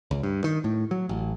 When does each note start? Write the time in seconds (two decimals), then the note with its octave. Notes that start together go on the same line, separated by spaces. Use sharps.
0.11 C#2
0.23 G2
0.44 D#3
0.64 A2
0.91 F#3
1.09 A1